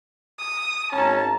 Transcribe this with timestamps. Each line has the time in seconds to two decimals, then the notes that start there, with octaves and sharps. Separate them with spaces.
0.39 D#6
0.92 G#1 C#4 A5 A#5